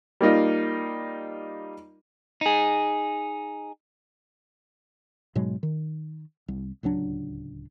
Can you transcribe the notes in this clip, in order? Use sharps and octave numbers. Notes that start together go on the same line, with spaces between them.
G3 A#3 D#4 F4
D#4 G#4
G#2 B2 F#3 G#3
D#3
C2
D1 C#2 F#3 D4